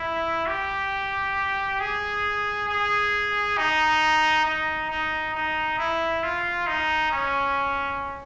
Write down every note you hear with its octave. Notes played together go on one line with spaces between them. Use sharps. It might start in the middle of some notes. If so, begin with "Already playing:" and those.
Already playing: E4
G4
G#4
G#4
D#4
D#4
D#4
D#4
E4
F4
D#4
C#4